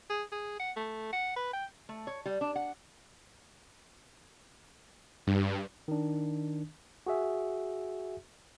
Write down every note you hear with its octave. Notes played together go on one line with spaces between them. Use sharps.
G#4
G#4
F#5
A3
F#5
B4
G5
A3
C#5
G3
D4
F#5
G2
D#3 D4
F#4 G#4 E5